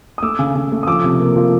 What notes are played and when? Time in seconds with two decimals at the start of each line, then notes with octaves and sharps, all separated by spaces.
0.18 D#6
0.22 A3 D6 E6
0.39 C#3
0.55 C#3
0.72 A3
0.83 D#6
0.87 F3 D6 E6
1.04 C3
1.20 A#3
1.36 F3